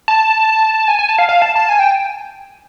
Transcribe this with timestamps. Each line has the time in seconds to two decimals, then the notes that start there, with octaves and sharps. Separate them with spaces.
0.08 A5
0.88 G#5
0.99 G#5
1.09 A5
1.19 F5
1.29 F5
1.42 A5
1.56 A5
1.69 G#5
1.79 G5